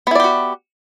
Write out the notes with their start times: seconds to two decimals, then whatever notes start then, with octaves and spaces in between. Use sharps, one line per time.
0.07 B3
0.11 E4
0.15 D5
0.20 G4
0.24 F#4